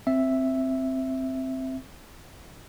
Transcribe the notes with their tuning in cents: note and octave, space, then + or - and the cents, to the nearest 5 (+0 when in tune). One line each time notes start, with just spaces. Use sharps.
C4 +0 E5 +0